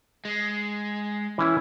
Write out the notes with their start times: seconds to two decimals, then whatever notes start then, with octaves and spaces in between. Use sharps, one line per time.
0.25 G#3
1.38 E3 C#4 E4